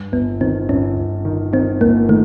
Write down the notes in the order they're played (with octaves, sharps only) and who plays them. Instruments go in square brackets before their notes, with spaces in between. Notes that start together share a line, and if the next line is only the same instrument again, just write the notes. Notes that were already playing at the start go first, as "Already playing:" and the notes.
Already playing: [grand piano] G2
[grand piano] G1 [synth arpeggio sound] B3
[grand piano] D#3 [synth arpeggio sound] C4
[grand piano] G1 [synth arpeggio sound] C#4
[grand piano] G1
D#3
[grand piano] D#3 [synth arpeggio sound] C4
[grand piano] G1 [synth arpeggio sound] A#3
[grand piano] D#3 [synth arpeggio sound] A3